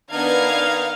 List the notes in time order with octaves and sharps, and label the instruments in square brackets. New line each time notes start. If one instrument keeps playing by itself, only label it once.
[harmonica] D#3 D#4 F6 [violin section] B3 D4 G#6 [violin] F5